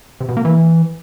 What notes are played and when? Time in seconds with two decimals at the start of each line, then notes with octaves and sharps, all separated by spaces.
0.21 C3
0.29 B2
0.37 A#3
0.45 E3